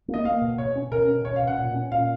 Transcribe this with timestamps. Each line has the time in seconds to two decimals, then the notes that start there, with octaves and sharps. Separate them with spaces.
0.08 A#3
0.14 D#5
0.25 A#3 F5
0.42 B2
0.58 B2 C#5
0.76 C#4
0.91 B2 A#4
1.08 C#4
1.25 B2 C#5
1.36 F5
1.42 B2
1.47 F#5
1.58 A#2
1.74 C#4
1.91 A#2 F5